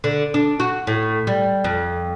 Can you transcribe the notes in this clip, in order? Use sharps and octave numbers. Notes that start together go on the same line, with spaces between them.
D3
D4
F#4
A2
G3
F2